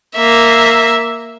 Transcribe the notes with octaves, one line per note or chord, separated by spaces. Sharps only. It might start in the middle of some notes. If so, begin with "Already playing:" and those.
A#3 E5